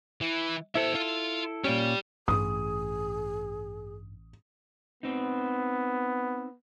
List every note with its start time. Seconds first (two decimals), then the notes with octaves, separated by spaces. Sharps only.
0.21 E3
0.75 E4 A4 C5 E5
0.95 F4
1.64 A#2 C#4 G4 D5
2.28 A1 G2 G#4 D#6
5.03 B3 C4 D#4